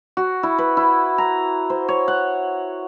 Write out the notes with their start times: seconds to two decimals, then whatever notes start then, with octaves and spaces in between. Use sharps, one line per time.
0.17 F#4
0.43 E4
0.58 B4
0.77 E4
1.18 A#5
1.70 C5
1.88 C#5
2.08 F#5